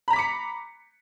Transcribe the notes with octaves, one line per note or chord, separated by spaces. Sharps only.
A#5 B5 D6 B6 C#7